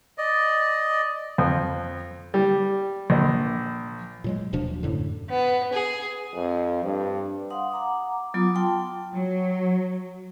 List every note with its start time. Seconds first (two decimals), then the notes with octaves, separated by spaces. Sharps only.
0.18 D5 D#5
1.38 F2
2.34 G3
3.10 A#1
4.24 A#2 F#3 G#3
4.53 D#1 B2 F3 D4
4.83 F#2 A2 D3
5.30 B3
5.73 G#4
6.35 F2
6.84 G2
7.50 F5 F#5 C6 D#6
7.72 F#5 A#5 D6
8.34 F#3 B3 F4 A#5 D6 D#6
8.55 F4 G5 A5 C6
9.14 F#3